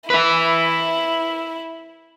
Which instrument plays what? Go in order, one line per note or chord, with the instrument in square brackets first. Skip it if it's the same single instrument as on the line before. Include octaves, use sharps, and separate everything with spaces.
[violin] E4 [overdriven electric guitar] B4 E5